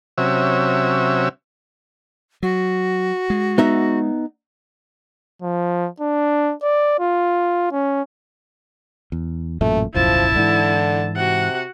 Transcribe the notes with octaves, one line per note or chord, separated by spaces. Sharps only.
C3 F#3 C#4 E5
F#3 F#4
G#3
B3 D#4 E5
F3
D4
D5
F4
C#4
E2
A1 F#2 A#2 A3
D1 B1 F#2 F3 E4 A5
G#2 D3 E3
C3 F#4 F#5